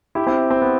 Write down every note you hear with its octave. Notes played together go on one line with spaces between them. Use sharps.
E4 G4
C4 E4
C4
B3